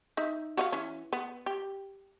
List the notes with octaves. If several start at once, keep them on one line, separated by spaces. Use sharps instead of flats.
D#4 E5
F#4 D#5 F5
E3 C#4
B3
G4